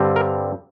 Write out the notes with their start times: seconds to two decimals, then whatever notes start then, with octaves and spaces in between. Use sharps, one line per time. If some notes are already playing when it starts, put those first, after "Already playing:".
Already playing: G2 D3 G3 C4
0.16 A#4